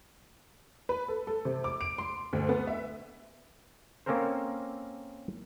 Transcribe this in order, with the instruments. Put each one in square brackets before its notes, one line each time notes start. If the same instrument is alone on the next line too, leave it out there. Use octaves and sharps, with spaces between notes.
[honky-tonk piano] B4
A4
A4
C3
D6
D7
C6
D2
B3
E5
[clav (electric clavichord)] A#3 C4 C#4 A4 A#4 C5